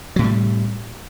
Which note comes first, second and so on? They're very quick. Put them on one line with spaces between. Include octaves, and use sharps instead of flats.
F#3 A2 C3 G3